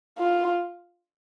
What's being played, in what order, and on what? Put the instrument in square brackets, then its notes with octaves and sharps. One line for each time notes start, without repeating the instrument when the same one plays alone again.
[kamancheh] F4